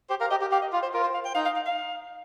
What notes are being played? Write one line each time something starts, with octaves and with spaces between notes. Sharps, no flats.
G4 C5
A#4 F5
G4 D#5
G4
G4 F5
D#5
F4 F5
C5
F4 A#4
C5
F5
G5
D#4 F5
F5
F5
F5